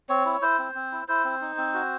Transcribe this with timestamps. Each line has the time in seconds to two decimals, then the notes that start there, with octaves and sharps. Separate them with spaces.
0.09 C4 C#5
0.25 E4
0.42 E4 C5
0.59 C4
0.75 C4
0.92 E4
1.08 E4 C5
1.25 C4
1.41 D#4
1.58 C4
1.74 F#4